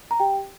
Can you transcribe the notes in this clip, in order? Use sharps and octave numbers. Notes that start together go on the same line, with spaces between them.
A#5
G4 G5